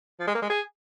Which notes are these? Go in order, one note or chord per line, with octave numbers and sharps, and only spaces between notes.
F3
G#3
A#3
G#3
G#4